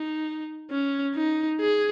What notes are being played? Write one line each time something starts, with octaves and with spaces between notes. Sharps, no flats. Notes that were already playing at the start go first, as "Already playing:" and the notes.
Already playing: D#4
C#4
D#4
G#4